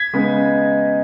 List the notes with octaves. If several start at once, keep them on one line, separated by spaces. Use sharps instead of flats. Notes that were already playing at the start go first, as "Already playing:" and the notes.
Already playing: G#6 B6
C#3 G#3 B3 D#4